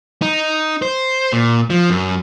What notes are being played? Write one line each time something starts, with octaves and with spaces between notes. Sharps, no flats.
D#4
C5
A#2
F3
F#2